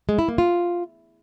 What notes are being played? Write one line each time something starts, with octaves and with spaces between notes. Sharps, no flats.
G#3
E4
A#3
F4